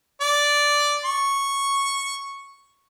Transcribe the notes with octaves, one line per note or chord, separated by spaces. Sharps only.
D5
C#6